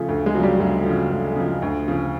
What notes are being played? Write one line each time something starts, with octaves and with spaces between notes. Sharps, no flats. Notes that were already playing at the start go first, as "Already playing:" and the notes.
Already playing: C#3 F3 A3
D2
G#3
C#3 F3 F#3 G3
D2 F#3
C#3 F3
D2
C#3 F3
D2
C#3 F3